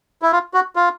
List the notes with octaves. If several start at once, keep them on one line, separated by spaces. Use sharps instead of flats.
E4
F4
F#4
F4